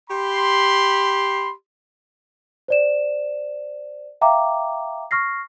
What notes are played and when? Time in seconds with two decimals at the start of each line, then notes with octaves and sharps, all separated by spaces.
0.10 G4 B5 C6
2.68 C5 D5 E7
4.21 E5 F5 G5 A#5 D6
5.11 C#6 F6 A#6 C7